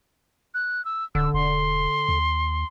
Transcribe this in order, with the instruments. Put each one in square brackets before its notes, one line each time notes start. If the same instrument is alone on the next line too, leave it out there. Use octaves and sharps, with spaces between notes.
[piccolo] F#6
E6
[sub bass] D1 [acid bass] D3 [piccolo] E6
[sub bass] E1 [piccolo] C6
[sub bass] D#2